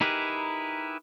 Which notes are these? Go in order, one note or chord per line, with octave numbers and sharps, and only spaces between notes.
D#4 E4 G4 G#4 A#4 B4